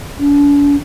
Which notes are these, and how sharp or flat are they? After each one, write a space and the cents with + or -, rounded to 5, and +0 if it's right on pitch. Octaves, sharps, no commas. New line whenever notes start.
D4 -45